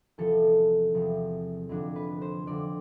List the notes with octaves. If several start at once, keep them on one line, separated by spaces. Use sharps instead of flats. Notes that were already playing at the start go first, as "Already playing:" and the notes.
E2 C3 F3 A4
E2 C3 F3
F2 D3 F3 D4
B4
C5
F2 D3 F3 D5